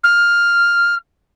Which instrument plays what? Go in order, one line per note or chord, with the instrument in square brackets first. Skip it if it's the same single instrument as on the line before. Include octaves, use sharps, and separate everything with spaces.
[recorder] F6